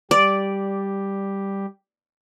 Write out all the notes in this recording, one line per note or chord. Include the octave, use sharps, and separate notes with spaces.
G3 G4 D5